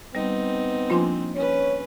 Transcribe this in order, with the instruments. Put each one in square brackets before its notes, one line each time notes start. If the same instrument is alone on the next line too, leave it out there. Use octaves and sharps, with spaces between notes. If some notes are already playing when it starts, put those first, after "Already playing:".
[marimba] G3 [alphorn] B3 [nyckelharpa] C4 D#4
[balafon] F3 F4 C6 [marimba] A#3 D4 G#5
[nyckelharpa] C#4 B4 [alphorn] C#5